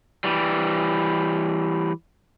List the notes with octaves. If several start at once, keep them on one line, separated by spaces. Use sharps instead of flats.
E3 G3